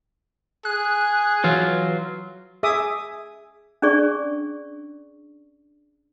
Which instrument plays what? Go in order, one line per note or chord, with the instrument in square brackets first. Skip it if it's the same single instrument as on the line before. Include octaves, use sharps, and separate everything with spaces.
[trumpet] G#4 [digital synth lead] F#6
[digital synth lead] E3 [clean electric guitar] F#3 F4
[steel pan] G#4 E5 D6 D#6
[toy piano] C#4 D4 G#4 D5 C#6